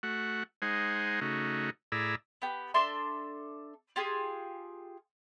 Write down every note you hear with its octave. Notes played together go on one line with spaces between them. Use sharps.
A3 F#4 F#5
G#3 D#4 C5 F#5 G#5
C#3 A3 D#4 F#4
A2 E4 G#4 D5 A#5 E6
B3 G4
D4 A4 E5 C6
F4 G4 G#4